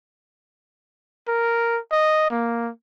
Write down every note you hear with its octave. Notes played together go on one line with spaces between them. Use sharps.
A#4
D#5
A#3